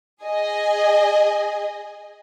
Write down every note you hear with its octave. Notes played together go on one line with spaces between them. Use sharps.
G#4 D#5 G#5